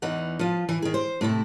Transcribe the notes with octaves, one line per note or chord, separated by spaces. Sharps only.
E2 E3 D#4 F#5
F3 F4
E3
D#3 G#4
C5
A2 C3 A3 E4